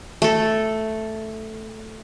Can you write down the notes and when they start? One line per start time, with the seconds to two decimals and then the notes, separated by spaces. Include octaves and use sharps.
0.22 A3 A4